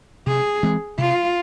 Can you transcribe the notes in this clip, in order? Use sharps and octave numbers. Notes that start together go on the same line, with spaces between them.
C3 G#4
E3 G#3 C4
C3 F4